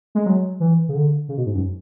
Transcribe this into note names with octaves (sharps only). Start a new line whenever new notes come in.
G#3
F#3
E3
C#3
D3
C#3
B2
G#2
F#2